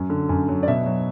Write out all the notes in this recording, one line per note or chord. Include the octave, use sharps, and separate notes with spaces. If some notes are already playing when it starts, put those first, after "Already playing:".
Already playing: F#2 F#3
D3
F#2
F#3
D5
B2 E5
F#3